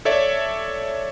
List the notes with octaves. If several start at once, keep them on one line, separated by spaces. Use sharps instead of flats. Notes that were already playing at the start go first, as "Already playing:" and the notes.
A4 C#5 D5 E5